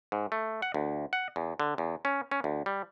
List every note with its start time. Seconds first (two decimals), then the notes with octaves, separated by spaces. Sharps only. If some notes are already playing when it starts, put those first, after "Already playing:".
0.12 G#2
0.32 A3
0.62 F#5
0.74 D2
1.13 F#5
1.36 E2
1.60 D3
1.78 E2
2.05 C#4
2.31 C#4
2.44 D2
2.66 G3